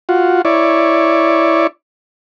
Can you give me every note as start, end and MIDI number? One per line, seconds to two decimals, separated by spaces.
0.09 0.42 65
0.09 0.42 66
0.45 1.67 64
0.45 1.67 73
0.45 1.67 74